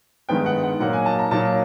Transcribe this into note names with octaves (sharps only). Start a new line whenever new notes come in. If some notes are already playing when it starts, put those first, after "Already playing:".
G2 D#3 G#3 B3 D#4 G5
F#5
F#5
A#2 F#3 A#3 D#4 F#5
G#5
A5
A#5
A#2 F#3 A#3 D#4 A5